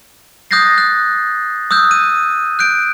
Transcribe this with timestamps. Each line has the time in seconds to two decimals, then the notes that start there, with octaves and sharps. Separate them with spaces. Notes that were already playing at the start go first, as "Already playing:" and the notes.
0.51 D#6 F#6 G6 A6 A#6 C7
0.78 F#6
1.71 D#6 E6 F#6 G6
1.91 D#7
2.59 F#6 G6 D7